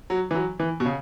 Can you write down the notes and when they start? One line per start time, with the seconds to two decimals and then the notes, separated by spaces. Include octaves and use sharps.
0.10 F#3
0.31 E3
0.35 F#3
0.60 E3
0.80 B2
0.85 C#3